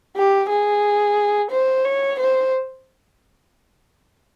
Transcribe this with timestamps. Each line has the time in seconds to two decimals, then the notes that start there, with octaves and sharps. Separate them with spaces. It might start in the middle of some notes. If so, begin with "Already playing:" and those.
0.16 G4
0.49 G#4
1.51 C5
1.85 C#5
2.19 C5